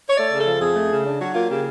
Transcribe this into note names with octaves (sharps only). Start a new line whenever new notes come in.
C#5
A3 D5
C#3
A4
F3
F2 G#4
A3
C#3
D4
F#3 F#4
A#3 F4
C#3 G4